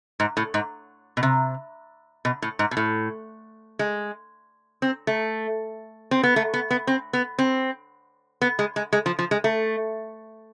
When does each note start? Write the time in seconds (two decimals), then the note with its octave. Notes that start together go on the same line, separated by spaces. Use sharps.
0.20 G#2
0.37 A2
0.54 G#2
1.17 B2
1.23 C3
2.25 B2
2.42 A2
2.59 G#2
2.71 B2
2.77 A2
3.79 G#3
4.82 C4
5.07 A3
6.11 C4
6.23 B3
6.36 A3
6.54 B3
6.71 B3
6.87 C4
7.13 B3
7.39 C4
8.41 B3
8.59 G#3
8.76 G#3
8.93 G#3
9.06 F3
9.19 F3
9.31 G#3
9.44 A3